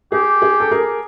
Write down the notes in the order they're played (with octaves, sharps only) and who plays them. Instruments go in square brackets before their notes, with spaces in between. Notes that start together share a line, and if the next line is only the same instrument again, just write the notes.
[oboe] G4 [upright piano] G#4
[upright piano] G#4
A4
G#4 A#4